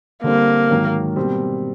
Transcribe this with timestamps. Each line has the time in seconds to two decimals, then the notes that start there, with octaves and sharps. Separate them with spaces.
0.23 D3 G3 A#3 C4
0.70 G#2 D#3 F#3
1.16 B2 G3 C4